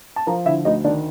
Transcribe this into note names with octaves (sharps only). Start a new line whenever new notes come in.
A5
F3 A#4 A#5
D3 E4 E5
D2 D#4 D#5
D#3 D4 D5